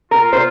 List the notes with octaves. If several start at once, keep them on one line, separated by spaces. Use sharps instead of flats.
F4 A#4
C5